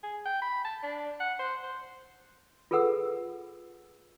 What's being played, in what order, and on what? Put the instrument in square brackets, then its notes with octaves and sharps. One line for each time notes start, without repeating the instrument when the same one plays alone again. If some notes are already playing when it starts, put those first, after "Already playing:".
[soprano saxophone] G#4
G5
B5
A5
D4
F#5
C5
C5
[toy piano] F4 G#4 A4 B4 F#5 E6